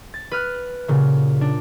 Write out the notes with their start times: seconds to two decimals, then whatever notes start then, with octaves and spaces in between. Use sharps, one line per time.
0.14 A6
0.31 B4 F6 F#6
0.88 A#2 C#3
1.41 D4